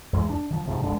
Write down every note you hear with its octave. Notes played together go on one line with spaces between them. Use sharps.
E2 G#2 G#3
D4
D#3 F3
G#2 C3 F3
E1 D3 G#3 D4